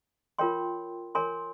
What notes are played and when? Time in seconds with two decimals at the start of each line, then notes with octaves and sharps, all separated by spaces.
0.39 F4 A#4 C#5 G5 C6
1.15 A#4 C#5 G#5 C6